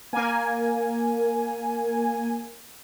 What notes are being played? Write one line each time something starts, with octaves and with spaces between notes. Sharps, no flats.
A#3 G#5